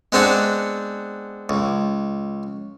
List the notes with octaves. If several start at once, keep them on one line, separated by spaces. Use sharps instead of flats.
G#3 B3 C4 D4 F#4
C#2